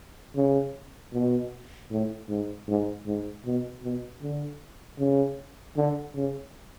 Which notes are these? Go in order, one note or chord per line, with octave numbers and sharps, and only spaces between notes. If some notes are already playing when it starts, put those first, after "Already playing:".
C#3
B2
A2
G#2
G#2
G#2
B2
B2
D3
C#3
D3
C#3